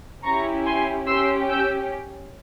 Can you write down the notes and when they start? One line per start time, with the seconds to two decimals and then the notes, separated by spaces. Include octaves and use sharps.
0.24 C#4 E4 G4 A#5 C#6
0.66 G#5 C6
1.07 C#4 G4 C6 E6
1.49 E6 G6